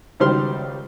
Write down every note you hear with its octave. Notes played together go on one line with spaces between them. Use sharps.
C#2 D#3 G3 C5 C6 F6